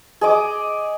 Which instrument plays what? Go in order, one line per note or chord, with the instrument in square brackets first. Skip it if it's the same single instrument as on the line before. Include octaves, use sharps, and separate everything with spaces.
[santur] G#4 D#5 D6